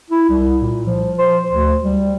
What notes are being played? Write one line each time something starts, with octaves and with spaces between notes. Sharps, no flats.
E4
C2
A#2
F3
C5
D2
G3